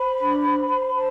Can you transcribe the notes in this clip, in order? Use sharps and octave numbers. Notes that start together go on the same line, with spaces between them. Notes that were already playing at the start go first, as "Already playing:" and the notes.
Already playing: C5 B5
D4
C5
C5
C5 A5